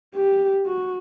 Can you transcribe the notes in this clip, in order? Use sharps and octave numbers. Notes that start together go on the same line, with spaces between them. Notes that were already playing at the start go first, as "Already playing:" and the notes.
G4
F#4